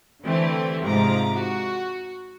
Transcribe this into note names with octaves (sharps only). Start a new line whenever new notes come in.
D3 E3 A3 C4 E4 G4
G#2 C3 F3 A#5 D6
F#4